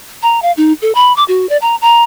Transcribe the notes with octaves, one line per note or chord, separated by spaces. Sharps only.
A#5
F5
D#4
A4
B5
D6
F#4
D5
A#5
A#5